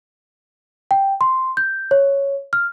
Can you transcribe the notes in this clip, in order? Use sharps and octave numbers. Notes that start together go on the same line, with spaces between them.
G5
C6
G6
C#5
F6